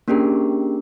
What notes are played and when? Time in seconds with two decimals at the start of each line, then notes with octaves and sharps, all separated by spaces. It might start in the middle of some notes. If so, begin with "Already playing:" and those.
0.08 A#3 C#4 D4 G4 G#4 A#4